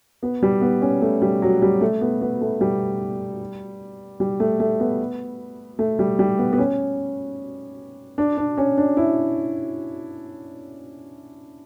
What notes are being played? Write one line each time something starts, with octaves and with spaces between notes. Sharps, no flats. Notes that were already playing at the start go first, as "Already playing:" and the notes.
B3
G3
B3
C#4
A3
G3
F#3
G3
A3
B3
B3
A3
G3
G3
A3
A3
B3
A3
G3
G3
B3
B3
C#4
D4
D4
C#4
D4
E4